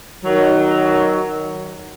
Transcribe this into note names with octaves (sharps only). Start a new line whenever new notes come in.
D#3 F#3